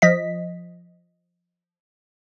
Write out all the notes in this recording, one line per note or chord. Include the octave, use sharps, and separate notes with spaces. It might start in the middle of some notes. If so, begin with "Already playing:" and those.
F3 D#5 B6